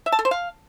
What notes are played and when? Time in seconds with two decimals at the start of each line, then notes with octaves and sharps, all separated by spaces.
0.06 E5
0.12 A5
0.19 A4
0.25 C5
0.31 F5